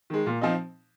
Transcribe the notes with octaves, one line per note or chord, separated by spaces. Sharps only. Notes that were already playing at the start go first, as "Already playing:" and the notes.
D#3 G#3
A#2
F3 C4 D#4